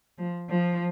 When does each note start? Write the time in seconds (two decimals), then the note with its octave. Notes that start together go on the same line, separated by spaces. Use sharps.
0.18 F3
0.49 F3